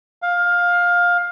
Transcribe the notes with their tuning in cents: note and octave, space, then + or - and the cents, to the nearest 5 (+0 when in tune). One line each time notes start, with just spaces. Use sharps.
F5 +15